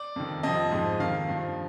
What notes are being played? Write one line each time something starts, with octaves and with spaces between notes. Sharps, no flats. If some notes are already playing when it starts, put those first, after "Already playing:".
Already playing: D5
F2 D#3
F2 C3 F3 D#5
G#2 F3
F2 D#3 F5
G2 F3